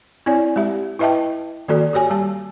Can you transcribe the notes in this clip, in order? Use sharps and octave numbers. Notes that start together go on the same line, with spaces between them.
C4 E4 C#5 D5 G#5
G#3 G4 E5
E4 B4 D#5 E5 G5 A5
D#3 A#3 F#4 A4 D5
F#4 G4 C#5 G#5
G3 A5